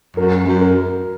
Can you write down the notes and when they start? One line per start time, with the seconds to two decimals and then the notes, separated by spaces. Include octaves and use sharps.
0.17 F#2 A#4
0.47 F#2
0.61 A#4